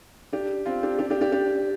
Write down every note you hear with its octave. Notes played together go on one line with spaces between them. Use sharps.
D4 G4
C4 F4
D4 G4
D4 G4
D4 G4
D4 G4
D4 G4